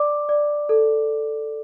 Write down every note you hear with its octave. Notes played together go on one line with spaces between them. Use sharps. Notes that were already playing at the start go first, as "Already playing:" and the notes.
Already playing: D5 D6
D5
A4